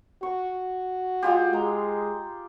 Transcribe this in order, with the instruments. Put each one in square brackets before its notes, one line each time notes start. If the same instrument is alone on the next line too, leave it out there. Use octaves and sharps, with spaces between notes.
[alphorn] F#4 [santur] C#6
[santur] G#3 F4 G4
[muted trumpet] G#3 [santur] A#5